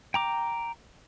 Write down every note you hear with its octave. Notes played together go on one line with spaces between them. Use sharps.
G5 A#5 D6